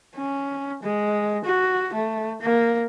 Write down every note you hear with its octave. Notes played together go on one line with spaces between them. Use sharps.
C#4
G#3
F#4
A3
A#3